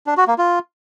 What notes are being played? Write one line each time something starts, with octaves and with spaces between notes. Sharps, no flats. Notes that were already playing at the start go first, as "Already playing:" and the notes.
D4
F#4
A#3
F4